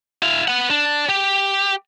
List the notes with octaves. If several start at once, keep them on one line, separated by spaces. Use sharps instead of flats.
E4 F5
B4 F#5
D4
G4